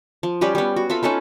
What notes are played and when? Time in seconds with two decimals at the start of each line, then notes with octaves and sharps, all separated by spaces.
0.23 F3
0.41 G3 C#4 G4 B4
0.55 G3 B3
0.76 F#4
0.90 F4 A4 E5 B5
1.03 C#4 D#4 A4 B4